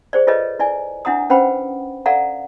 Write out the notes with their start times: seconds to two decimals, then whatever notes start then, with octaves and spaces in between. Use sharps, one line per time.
0.13 G#4 C5 D5
0.27 F4 G#4 A4 B4 C#5 D#5
0.59 E4 D5 G#5
1.05 D4 E4 F#5 A#5 D#6
1.30 C#4 B4 C5 F#5 G5 B5
2.06 A4 D5 F5 F#5 A#5